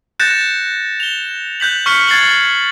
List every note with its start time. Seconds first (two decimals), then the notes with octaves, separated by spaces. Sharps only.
0.20 F#6 G6 A6 A#6 C#7 E7
1.00 F7 G7
1.60 F#6 G6 B6 F#7
1.86 C#6 F6 F#6 B6 C#7 G7
2.08 G#6 A6 C7 C#7 F#7